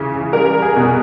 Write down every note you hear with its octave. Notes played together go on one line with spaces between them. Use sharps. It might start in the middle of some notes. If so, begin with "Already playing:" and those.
Already playing: C#3 E3 G#4
G3 A#4
G#4
B2